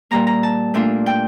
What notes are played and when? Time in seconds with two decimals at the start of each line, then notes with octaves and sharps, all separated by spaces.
0.11 A#2 G3 A#3 A#5
0.27 A#5
0.43 A5
0.74 A#2 A3 D4 F4
1.06 G5